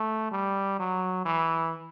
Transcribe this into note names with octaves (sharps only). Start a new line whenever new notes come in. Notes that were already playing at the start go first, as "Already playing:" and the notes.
Already playing: A3
G3
F#3
E3